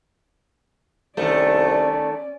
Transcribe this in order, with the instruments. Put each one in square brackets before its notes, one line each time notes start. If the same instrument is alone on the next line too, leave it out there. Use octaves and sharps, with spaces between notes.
[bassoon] C2 [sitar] D#3 A3 [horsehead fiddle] C#4 D5